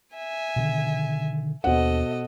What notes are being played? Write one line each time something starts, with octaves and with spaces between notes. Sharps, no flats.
E5 G#5
B2 D3 D#3
D#2 B2 D4 A4 C5 D#5 F#5